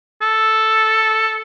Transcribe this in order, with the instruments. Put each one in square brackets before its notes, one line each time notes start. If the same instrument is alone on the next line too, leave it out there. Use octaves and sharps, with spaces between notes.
[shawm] A4